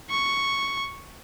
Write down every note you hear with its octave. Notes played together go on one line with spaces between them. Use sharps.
C#6